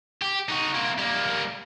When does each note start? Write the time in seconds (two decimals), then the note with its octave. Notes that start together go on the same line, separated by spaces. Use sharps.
0.22 G4
0.49 D#4 F#4
0.74 A#3 C4
0.98 G3 A#3